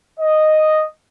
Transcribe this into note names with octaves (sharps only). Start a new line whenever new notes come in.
D#5